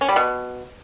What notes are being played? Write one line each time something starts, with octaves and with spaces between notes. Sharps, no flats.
C#4
G3
B2